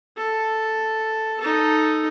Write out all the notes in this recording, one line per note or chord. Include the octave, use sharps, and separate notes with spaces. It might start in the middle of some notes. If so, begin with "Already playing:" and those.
A4
D#4 A4